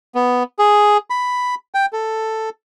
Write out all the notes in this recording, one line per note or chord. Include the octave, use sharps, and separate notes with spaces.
B3
G#4
B5
G5
A4